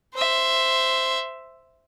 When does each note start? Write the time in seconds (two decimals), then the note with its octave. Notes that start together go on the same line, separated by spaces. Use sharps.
0.14 C5 E5